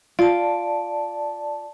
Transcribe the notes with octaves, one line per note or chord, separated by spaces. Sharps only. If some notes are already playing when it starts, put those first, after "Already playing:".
F4 D5 A5